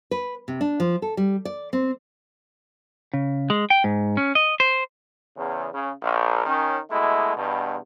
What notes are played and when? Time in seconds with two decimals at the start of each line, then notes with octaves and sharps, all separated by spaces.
0.11 B4
0.48 C3
0.61 D4
0.80 F3
1.02 A4
1.17 G3
1.45 D5
1.73 C4
3.13 C#3
3.50 G#3
3.70 G5
3.84 G#2
4.17 C#4
4.35 D#5
4.60 C5
5.37 E2 C#3
5.72 C#3
6.02 A#1
6.46 D#3 C#4
6.90 B2 G#3 A3 E4
7.36 E2 G2 B2